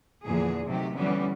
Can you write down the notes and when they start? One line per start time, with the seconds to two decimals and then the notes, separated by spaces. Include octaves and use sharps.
0.25 E2 A#2 D3 F3 G#4
0.66 D2 C3 D#3 F#3 A3 G4
0.97 D3 E3 G3 B3 C#4